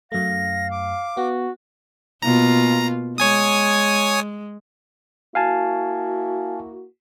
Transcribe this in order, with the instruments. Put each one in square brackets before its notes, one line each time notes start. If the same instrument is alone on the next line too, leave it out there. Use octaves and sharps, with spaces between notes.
[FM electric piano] F#2 A3 [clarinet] F5 [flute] A#6
[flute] D6
[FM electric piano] B3 [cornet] F#4
[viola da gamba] B2 A#3 F4 [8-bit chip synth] A#5
[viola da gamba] G#3 [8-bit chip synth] C#5 G#5 D#6
[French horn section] A#3 E4 F#4 [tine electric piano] F5 G#5 A5